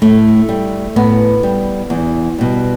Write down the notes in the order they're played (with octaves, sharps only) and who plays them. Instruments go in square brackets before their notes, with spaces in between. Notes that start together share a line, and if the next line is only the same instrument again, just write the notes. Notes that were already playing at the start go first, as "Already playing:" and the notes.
[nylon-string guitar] A2 A3
G3
A2 B3
G3
E2
B2 G3